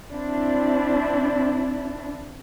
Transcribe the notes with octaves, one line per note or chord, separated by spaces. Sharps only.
C4 D4 E4